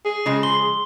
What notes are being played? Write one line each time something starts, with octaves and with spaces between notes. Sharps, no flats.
G#4
C#3 F3 G#3
C6 G7